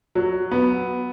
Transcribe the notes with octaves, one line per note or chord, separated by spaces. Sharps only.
F#3
B3